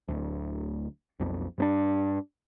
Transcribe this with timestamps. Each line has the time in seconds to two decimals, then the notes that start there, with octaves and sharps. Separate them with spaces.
0.08 D1 D2
1.20 B1 F2
1.58 G2 C4 D4